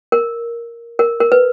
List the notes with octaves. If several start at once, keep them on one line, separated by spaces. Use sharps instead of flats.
A#4
A#4
A#4
B4